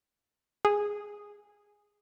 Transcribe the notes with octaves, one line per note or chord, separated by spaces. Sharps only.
G#4